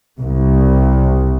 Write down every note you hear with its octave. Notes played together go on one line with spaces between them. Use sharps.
C2